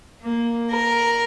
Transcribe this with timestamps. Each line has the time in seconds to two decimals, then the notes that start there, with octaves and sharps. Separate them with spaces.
0.24 A#3
0.71 A#4